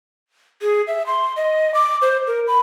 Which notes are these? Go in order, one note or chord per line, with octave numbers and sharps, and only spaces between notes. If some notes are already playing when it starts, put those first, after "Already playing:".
G#4
E5
C6
D#5
D6
C5
A#4
B5